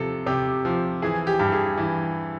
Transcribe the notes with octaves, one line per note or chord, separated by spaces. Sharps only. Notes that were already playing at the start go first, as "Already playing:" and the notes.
Already playing: C3 F3 A4
C3 G4
F3
E3 G#4
G4
G2
G#4
E3